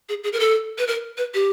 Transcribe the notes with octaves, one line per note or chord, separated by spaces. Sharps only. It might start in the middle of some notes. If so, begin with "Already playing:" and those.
G#4
G#4
A#4
A4
B4
A#4
B4
G4